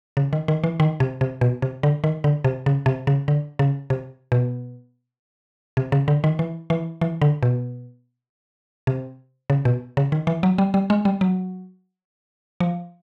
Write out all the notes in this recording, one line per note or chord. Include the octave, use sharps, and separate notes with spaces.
C#3
D#3
D#3
E3
D#3
C3
C3
B2
C3
D3
D#3
D3
C3
C#3
C3
C#3
D3
C#3
C3
B2
C3
C#3
D3
D#3
E3
E3
E3
D3
B2
C3
C#3
B2
C#3
D#3
E3
F#3
G3
G3
G#3
G3
F#3
F3